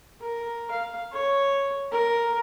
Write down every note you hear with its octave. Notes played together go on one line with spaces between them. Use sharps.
A#4
F5
C#5
A#4